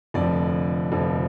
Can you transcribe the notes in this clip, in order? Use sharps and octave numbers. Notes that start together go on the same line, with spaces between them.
F1 F2 D3 F3 D5
F1 F2 D3 F3